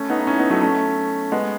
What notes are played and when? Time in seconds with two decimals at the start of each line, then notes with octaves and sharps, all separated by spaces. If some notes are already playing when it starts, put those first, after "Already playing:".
Already playing: A3 C#4
0.10 B3 D#4
0.21 D#4
0.27 C#4 E4
0.38 B3 D#4
0.50 F#3 A3
0.62 A3 C#4
1.32 G#3 B3